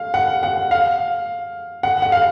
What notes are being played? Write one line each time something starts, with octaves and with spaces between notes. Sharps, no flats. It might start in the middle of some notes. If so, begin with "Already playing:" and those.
Already playing: F5
F#5
F#5
F5
F#5
F#5
F5